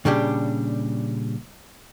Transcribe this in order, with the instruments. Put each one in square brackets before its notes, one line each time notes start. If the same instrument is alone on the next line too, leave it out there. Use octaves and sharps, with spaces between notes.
[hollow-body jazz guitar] A#2 C#3 G3 D4 G4